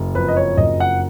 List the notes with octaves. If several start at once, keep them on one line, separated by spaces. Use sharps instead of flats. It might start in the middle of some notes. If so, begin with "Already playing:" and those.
Already playing: F#1
F2 B4
D#5
C#5
F#1 D#5
F#5